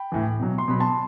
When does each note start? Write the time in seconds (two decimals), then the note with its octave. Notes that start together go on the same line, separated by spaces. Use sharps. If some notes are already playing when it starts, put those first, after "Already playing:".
Already playing: G5 B5
0.12 A2 E3
0.40 B2 F#3
0.58 C6
0.68 B2 F#3 B5
0.80 A5 C6